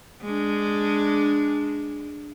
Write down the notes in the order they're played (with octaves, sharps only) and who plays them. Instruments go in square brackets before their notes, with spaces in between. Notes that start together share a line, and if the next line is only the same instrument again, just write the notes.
[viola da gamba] G#3 D4